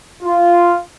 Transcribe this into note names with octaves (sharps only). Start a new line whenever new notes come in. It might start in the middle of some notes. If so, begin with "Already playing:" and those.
F4